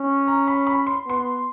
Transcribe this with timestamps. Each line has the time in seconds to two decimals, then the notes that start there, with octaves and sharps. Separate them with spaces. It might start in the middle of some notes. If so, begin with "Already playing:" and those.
Already playing: C#4
0.28 A#5
0.48 B5
0.67 B5
0.87 C6
1.06 B3 C6